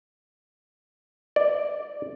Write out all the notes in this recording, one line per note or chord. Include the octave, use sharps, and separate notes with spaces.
D5